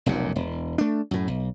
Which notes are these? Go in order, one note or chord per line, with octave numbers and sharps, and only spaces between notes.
F1 B1 F#2 A#2
E1
A3 D4
F#2 A2
B1